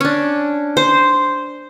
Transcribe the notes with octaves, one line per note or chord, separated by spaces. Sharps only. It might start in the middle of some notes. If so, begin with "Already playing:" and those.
C#4 D4
C5